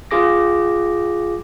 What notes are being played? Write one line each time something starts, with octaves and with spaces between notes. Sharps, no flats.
F4 G#4 D6 A#6